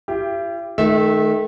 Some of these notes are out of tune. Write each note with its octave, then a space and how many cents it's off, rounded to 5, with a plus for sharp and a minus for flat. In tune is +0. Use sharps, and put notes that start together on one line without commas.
E4 +45 G4 +0
D#3 +0 A3 -35 E5 -15